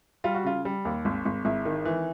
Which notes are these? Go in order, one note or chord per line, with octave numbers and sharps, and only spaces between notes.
G3 F4
F#4
C#3 F4
G3
D#2
G#1
G#1
G#1 E4
D#3
E3